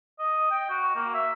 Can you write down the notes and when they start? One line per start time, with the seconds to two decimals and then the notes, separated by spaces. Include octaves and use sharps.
0.19 D#5
0.50 G5
0.70 F#4
0.95 A#3
1.14 E5